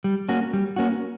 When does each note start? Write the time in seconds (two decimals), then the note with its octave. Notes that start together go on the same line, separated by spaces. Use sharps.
0.04 G3
0.29 A#3 C#4 F#4
0.53 G3
0.76 A#3 C#4 F#4